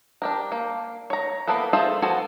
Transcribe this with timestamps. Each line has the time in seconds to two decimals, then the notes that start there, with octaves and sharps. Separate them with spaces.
0.22 D4 G4 A#4
0.52 A#3
1.10 C#5 A#5
1.48 A#3 B3 E4 A4 B4
1.73 F4 G#4 A4 C5 E5
2.02 F3 B3 F#4 A4 G#5